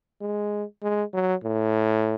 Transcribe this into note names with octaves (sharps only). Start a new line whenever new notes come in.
G#3
G#3
F#3
A2